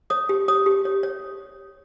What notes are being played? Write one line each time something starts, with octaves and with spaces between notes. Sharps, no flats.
C#5 D#6
G4
C#5 D#6
G4
C#5
C#5